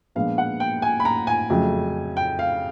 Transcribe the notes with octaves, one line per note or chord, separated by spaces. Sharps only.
A#2 F3 G#3 B3 D4 F5
F#5
G5
G#5
B5
A#5
G#5
F2 C#3 F#3 A3
G5
F5